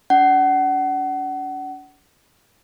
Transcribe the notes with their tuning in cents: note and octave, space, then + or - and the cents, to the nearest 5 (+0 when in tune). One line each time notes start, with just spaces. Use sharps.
D4 -45 F#5 +30